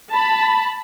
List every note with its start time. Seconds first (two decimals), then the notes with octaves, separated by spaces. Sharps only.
0.12 A5 B5